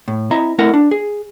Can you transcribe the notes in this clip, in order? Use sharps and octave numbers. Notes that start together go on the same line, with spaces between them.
A2
C4 E4 D#5 E5 A#5
A3 C4 E4 A#4 F#5
D4
G#4